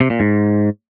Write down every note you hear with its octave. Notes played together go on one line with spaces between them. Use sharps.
C3
A#2
G#2